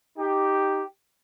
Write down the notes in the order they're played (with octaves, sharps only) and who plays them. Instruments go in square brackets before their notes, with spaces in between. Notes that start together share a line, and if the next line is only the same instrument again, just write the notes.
[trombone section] D#4 G4